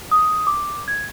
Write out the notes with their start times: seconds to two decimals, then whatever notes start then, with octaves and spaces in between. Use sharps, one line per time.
0.11 D#6
0.47 D6
0.88 G#6